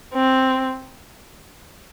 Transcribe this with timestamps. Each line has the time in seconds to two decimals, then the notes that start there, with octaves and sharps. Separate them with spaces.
0.13 C4